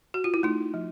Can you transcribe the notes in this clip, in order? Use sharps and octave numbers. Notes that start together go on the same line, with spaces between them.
F#4
F4
E4
A3 D#4
F3